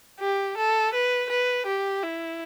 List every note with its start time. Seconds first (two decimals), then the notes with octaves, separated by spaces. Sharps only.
0.20 G4
0.57 A4
0.94 B4
1.29 B4
1.66 G4
2.03 E4